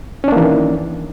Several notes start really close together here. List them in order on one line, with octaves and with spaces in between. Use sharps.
C#4 D4 A#3 E3 D#3